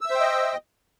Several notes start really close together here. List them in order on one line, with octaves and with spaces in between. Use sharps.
E6 E5 C5 G5 D#5